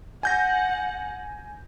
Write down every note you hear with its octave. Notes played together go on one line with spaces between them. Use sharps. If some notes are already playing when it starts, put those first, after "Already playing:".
F#5 G#5 G6 A#6